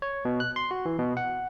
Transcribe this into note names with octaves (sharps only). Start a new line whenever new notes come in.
C#5
B2
F#6
C6
F#4
E3
B2
F#5